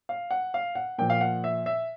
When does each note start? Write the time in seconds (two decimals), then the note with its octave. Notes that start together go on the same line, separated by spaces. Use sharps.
0.09 F5
0.31 F#5
0.54 F5
0.75 F#5
0.98 A#2 F3 G5
1.10 F5
1.21 F#5
1.44 E5
1.66 E5